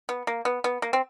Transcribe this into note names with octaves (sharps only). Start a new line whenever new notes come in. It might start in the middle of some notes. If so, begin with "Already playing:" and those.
B3
A#3
B3
B3
A#3
C4